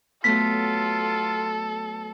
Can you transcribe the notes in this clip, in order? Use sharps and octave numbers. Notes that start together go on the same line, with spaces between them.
F#3 A3 B3 F4 A4 B6